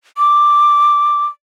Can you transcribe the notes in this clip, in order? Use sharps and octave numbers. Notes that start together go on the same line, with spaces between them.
D6